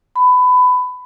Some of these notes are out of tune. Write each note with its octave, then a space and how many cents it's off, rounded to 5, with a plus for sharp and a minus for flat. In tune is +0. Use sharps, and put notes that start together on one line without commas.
B5 +20